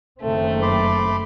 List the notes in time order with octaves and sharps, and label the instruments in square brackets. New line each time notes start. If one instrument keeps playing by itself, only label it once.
[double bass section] F#1 D#3 C4 [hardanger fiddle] A3
[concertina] B5 C6 D6